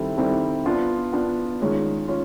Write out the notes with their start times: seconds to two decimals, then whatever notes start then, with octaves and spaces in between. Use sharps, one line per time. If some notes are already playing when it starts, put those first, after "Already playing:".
Already playing: D#3 G3 C4 E4 A4
0.17 D#3 G3 C4 E4 A4
0.66 B3 D4 F4
1.13 B3 D4 F4
1.60 D#3 G#3 C#4 F4
2.08 C#4 F4